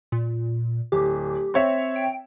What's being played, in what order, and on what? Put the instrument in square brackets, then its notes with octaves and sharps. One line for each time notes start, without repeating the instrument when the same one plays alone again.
[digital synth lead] A#2
[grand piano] D1 [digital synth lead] G4
[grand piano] C4 C#5 E5
[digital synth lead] G5